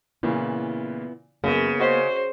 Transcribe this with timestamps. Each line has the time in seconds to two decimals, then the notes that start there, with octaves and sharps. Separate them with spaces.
0.23 A#2 C#3 E3 B3 E4
1.44 F#2 C#3 A#3 B3
1.80 F#4 C5 D#5 C#6